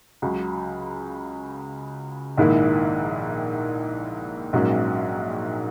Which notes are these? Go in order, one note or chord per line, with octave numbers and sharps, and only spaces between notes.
C#2 C#3 F#3
A#1 G#2 D#3 A#3 E4
A#1 G#2 F#3 A#3 C#4